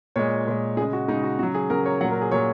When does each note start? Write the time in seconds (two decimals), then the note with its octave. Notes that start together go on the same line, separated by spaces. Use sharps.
0.16 A#2 G#3 C#5
0.47 A#2 G#3
0.77 C#3 G#4
0.82 G#3
0.93 F#4
1.08 C#3 G#3 D#4
1.23 F#4
1.39 C#3 F#3 F#4
1.55 G#4
1.70 C#3 F#3 A#4
1.85 C#5
2.01 A#2 F#3 F#5
2.11 A#4
2.22 G#4
2.31 A#2 F#3 C#5